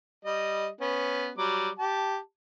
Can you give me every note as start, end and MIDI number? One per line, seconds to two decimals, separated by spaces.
0.25 0.68 55
0.25 0.68 75
0.81 1.30 59
0.81 1.30 61
1.38 1.69 54
1.38 1.69 55
1.38 1.69 86
1.78 2.18 67
1.78 2.18 81